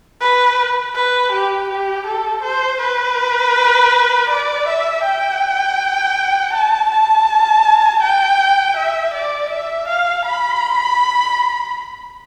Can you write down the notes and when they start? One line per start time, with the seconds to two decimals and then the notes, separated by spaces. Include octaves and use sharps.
0.21 B4
0.95 B4
1.33 G4
1.70 G4
2.07 A4
2.43 C5
2.81 B4
4.30 D5
4.68 E5
5.04 G5
6.54 A5
6.91 A5
8.03 G5
8.77 E5
9.14 D5
9.51 E5
9.88 F5
10.26 B5